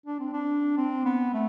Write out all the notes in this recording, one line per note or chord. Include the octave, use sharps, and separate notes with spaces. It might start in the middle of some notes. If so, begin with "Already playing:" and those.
D4
C4
D4
C4
B3
A3